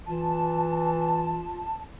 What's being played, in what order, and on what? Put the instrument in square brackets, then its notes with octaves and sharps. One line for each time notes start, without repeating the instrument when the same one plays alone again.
[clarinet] E3 [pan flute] F4 [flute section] A5